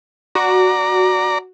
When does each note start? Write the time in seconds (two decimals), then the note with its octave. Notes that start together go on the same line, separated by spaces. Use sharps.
0.35 F#4 D5 A#5